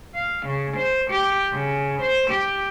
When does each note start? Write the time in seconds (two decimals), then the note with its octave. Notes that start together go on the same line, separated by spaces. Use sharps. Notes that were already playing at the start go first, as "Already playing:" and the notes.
0.15 F5
0.46 C#3
0.77 C5
1.11 G4
1.53 C#3
2.01 C5
2.30 G4